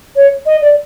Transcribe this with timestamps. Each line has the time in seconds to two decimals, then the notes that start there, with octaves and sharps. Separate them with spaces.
0.15 C#5
0.45 D#5
0.61 D5